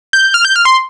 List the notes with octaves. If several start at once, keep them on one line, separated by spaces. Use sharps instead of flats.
G6
F6
G6
F6
C6